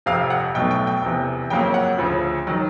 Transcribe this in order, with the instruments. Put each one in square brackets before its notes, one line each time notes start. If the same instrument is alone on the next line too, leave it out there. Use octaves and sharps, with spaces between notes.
[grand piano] F1 F2 C3 F5
F#5
B1 B2 F#3 A3 G5
G5
G5
F1 E2 C3
F2 C#3 F#3 A#3 C#4 G5
F#5
D2 C#3 F3
D#3 F#3